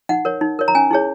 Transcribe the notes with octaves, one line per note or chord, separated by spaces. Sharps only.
D#4 F#5
A#4 C#5
D#4
A#4 C#5
A#5
C#4 G#5
E4 G#4 C#5